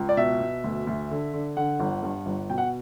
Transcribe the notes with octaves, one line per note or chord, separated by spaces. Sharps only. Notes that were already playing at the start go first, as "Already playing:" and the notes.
Already playing: C#2
D5
B2 E5
B2
D2
D2
D3
D3
D3 F#5
G1
G2
G1
B2 G5
F#5